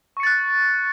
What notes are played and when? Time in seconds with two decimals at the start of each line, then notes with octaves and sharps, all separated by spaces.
0.17 C#6
0.20 C#7
0.23 A6
0.27 F#6